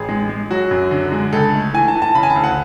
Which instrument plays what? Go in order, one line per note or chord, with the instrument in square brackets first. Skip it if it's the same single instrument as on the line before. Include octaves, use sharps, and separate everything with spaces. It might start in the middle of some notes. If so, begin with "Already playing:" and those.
Already playing: [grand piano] A1 G#4
G#3
G#3
F#3 F#4
F#2
D3
G#3
C#2 A4
A3
E3 G#5
A5
E3
A5
C#3 B5
G#5
A5
D2
F#5